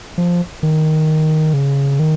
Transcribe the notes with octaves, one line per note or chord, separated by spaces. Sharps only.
F3
D#3
C#3
D#3